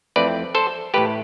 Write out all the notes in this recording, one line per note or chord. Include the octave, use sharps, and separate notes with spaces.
F2 E3 A3 C4 B4 D5
A4 C5
A2 E3 A3 G4 B4